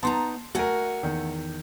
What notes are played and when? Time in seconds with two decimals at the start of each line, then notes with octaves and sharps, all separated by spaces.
0.03 B3 D#4 A5 A#5 C6
0.55 A3 F#4 A#4 F#5 G#5
1.03 E2 D#3